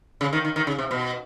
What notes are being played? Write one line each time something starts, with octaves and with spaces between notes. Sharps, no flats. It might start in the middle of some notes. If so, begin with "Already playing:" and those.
C#3
D#3
D#3
D#3
C#3
C3
B2